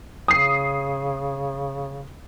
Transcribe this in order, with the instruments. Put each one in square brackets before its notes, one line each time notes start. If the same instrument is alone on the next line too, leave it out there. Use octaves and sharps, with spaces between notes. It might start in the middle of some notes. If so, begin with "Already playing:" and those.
[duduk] C#3 [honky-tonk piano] D#6 C7